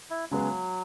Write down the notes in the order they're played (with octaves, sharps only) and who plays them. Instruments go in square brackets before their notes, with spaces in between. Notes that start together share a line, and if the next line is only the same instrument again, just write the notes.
[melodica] E4
[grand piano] C#3 G#3 B3 G#4 [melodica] F#3